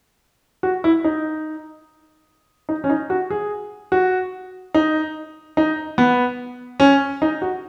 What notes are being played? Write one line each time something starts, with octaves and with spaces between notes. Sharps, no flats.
F#4
E4
D#4
D#4
C#4
D#4
F#4
G#4
F#4
D#4
D#4
B3
C#4
D#4
F#4